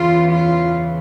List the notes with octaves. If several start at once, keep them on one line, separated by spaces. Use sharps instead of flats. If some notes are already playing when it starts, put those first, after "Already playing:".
Already playing: E2 C#3 E3 F4
F4